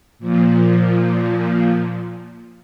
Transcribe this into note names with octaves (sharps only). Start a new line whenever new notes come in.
A#2 F3